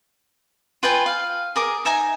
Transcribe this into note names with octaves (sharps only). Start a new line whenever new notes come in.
F4 B4 G5 G#5
F5
G#4 A#4 D6
D#4 E5 G#5 A#5